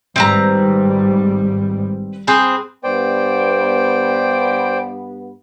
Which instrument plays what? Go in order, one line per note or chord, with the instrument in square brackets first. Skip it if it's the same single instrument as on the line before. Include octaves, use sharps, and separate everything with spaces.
[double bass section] G#1 G#2 G3 [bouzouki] C4 B4 A#5
[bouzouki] C4 G#4 B4
[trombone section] G2 B3 [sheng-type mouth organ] C5 D5 G5